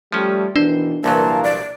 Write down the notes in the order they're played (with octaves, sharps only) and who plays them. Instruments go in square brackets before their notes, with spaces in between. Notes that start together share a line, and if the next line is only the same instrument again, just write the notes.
[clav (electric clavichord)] F3 C#4 [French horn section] G3 A3
[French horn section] B2 D#3 E3 [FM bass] D4 [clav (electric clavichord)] C5
[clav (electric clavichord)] C2 A#2 F#3 [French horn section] E3 A#3 [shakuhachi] A5
[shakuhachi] D5